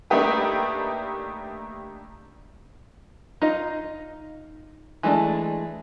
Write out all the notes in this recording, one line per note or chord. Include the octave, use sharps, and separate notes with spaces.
A3 A#3 D4 D#4 G4 B4
D#4 F4 D#5
E3 G#3 A3 D4 A5